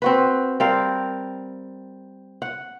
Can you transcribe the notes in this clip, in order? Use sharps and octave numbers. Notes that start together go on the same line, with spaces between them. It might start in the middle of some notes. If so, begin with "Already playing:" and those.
C4 F#4 B4
G3 C4 A#4 F5
F#5